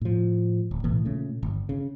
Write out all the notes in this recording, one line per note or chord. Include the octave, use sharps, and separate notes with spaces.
A2 F3
D1
B1 A2 E3
A#2 C#3 A3
G1
C#3